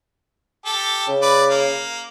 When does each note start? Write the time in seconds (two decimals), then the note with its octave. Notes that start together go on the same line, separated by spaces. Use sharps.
0.65 G4 A4
1.08 C#3
1.22 B4 D5
1.50 A#3